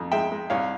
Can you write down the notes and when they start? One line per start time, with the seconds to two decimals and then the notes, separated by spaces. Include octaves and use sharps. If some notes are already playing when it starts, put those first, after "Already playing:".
Already playing: F2
0.12 G#3 E5 G5
0.32 G#3
0.50 C2 C#5 F5